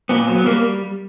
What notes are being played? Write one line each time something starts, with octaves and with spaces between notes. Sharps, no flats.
A#2 B3
F#3
B3
G3 A#3